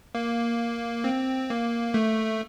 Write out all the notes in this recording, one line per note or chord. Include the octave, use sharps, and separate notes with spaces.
A#3
C4
A#3
A3